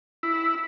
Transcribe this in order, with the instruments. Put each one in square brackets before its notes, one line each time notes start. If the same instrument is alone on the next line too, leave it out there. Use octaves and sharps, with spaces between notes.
[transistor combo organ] E4